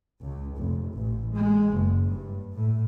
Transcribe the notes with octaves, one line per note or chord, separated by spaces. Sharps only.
C#2
F1
A1
G#3
F#1
G2
A2